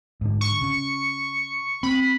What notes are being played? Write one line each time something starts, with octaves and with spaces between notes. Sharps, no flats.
G#2 D3
C#6
C#3
C4 B5